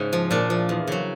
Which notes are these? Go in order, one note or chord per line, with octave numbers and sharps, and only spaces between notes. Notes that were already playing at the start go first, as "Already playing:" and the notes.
Already playing: G#2 C#3 C#4
F3
A#2 D4
F3
E2
C#3 F#3